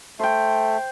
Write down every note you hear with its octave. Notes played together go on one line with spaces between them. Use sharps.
A3 C5 G5